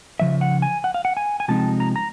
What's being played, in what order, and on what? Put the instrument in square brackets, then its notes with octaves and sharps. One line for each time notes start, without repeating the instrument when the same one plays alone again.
[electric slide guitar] C#3 F3 E5
F#5
G#5
F#5
F5
F#5
G#5
G#5
C3 F3 G#3 C4 D#4 A5
A#5
A#5